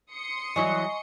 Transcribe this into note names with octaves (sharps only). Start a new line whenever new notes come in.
C6 D#6 C#7
E3 F#3 E4 D#5 G#5 C#6